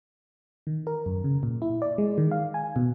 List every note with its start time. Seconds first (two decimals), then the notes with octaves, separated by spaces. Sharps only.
0.67 D#3
0.87 A#4
1.06 F#2
1.24 C#3
1.43 A#2
1.62 E4
1.82 D5
1.98 G#3
2.18 D#3
2.31 F5
2.54 G#5
2.76 B2